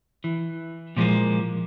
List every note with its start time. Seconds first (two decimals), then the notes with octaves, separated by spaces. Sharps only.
0.24 E3
0.97 A#2 F3 G3 G#3 A#3